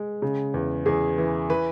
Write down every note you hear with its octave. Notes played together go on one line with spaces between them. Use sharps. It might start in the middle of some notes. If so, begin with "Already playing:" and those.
Already playing: G#3
C#3
E2
E2 G#4
E3
E3 B4